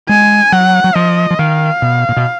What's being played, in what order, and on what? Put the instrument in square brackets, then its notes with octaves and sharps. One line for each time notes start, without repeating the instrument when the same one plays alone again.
[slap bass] G#3 [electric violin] G#5
[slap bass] F#3 [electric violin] F#5
[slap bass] F#3
[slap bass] F3 [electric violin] D#5
[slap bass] F3
[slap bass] D#3 [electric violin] F5
[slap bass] B2
A#2
B2